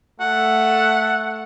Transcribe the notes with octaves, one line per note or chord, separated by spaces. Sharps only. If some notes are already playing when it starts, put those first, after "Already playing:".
A3 F#5